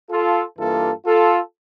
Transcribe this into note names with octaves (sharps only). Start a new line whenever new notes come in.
F4 A4
G2 E3 A#3 F4 A4
F4 A4